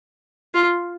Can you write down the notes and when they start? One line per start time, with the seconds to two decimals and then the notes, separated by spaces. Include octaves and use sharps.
0.54 F4